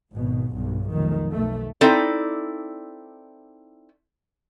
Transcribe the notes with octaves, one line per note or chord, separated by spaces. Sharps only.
G#1 B2
B1 G2
F1 B1 D#3
B1 A3
C4 D#4 E4 A4 D5